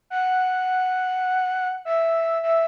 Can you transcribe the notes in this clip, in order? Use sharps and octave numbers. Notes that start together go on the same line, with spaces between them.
F#5
E5
E5